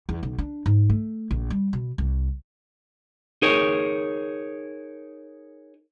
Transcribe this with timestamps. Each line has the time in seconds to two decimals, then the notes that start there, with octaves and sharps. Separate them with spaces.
0.09 E2
0.23 B1
0.38 D4
0.66 G#2
0.90 A3
1.31 A#1
1.50 G3
1.73 B2
1.98 C2
3.42 D#4 G#4 A#4 C#5